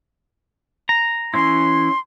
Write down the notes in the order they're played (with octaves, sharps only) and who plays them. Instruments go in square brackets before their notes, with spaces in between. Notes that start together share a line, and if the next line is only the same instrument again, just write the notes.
[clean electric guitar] A#5
[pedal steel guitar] E3 C#4 E4 [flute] C6